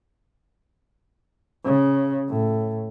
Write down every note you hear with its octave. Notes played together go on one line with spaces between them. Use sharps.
C#3
A2